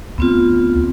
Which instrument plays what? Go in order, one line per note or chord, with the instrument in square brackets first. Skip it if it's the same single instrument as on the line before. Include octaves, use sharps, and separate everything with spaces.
[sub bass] D2 [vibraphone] B3 C4 F4